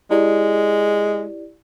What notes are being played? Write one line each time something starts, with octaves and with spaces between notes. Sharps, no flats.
G#3 E4 G4 D5